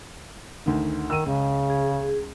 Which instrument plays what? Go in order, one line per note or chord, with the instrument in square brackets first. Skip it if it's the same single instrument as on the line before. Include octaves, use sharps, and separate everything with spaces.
[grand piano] D2 D#3
[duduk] D#3 [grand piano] E6 D#7
[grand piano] C#2 [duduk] C#3
[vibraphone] G#4